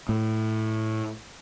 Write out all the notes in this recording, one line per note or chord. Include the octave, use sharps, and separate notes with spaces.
A2